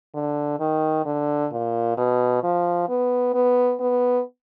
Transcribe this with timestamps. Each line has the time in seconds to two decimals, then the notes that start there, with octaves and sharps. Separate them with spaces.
0.15 D3
0.59 D#3
1.06 D3
1.52 A#2
1.98 B2
2.43 F3
2.89 B3
3.34 B3
3.80 B3